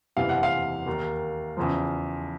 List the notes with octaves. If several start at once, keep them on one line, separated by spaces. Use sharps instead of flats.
F#1 E2 C3 E3 F5
F#5
F5
D#2 D#3
E2 C#3 F3